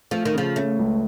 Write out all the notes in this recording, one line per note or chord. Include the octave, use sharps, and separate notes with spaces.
F3 A3
D#3
C#3 F3
A3 C#4
C#2